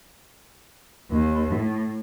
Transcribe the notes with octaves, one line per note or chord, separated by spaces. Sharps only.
D#2
A2